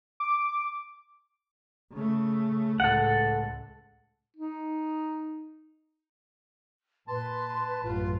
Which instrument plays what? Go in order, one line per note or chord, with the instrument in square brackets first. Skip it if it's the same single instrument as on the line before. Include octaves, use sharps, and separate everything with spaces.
[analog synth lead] D6
[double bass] C#3 A3
[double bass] C#2 A2 [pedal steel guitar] A4 F#5
[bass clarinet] D#4
[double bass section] A#2 [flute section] B4 [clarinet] A5 [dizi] C6
[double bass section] A1 F#2 F#3 [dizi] F4